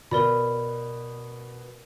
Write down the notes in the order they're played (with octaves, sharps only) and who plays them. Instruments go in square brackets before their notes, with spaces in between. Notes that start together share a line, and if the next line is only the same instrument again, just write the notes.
[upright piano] B2 [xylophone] A#4 D5 B5